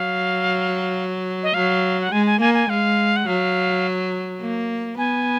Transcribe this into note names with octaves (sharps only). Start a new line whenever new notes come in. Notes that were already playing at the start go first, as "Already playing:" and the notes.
Already playing: F#3 F5
D#5
F#3 F5
F#5
G#3 G#5
G#5
A#3 G#5
G#5
G#3 F5
F#5
F#3 F5
A#3
B3 G#5